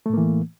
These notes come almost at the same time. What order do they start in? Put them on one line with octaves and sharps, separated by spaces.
A3 A2 A#3 E3